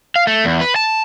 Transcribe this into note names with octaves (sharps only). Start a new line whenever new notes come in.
F5
A3
E2
B4
A5